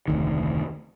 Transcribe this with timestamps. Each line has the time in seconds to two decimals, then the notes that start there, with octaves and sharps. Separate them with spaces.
0.08 F1 D2 D#3